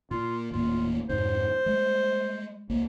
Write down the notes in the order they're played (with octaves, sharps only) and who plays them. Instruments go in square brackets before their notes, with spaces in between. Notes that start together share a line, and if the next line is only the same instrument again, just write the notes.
[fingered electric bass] A#2 [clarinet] F4
[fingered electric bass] D#1 A2 A#3 [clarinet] F4
[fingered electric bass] F2 G#2 C3 [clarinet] C5
[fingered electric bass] G3 G#3
C2 A#3